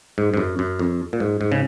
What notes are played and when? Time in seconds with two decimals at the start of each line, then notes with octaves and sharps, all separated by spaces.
0.18 G#2
0.34 G#2
0.37 F#2
0.59 F#2
0.79 F2
1.13 A#2
1.20 G#2
1.41 G#2
1.52 C#3